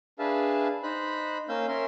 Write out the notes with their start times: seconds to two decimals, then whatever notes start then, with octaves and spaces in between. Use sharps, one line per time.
0.19 D4 G#4 B4 E5 F5 A5
0.83 D#4 C5 B5 F#6
1.49 A#3 C#4 F5 E6 G6
1.68 C#4 A#4 E5 C6